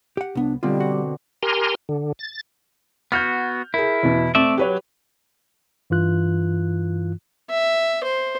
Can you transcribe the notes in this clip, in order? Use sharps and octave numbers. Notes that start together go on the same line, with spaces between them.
G4 F#5
C2 B3 D4
B2 D3 G3 C4 F4
F#4
G4 A#4 G#5 A#5 C6
D3
A6
B3 F#4 F6 G6
E4 G#4 A#4
E2 B2
A3 C4 D5 E5
F#3 G4 B4 C#5
G2 E3 F4 F#6
E5
C5